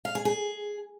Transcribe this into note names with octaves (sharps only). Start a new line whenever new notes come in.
F5
G#4
G#4